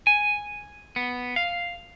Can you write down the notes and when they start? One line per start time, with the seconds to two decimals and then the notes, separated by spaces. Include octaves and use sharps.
0.07 G#5
0.96 B3
1.36 F5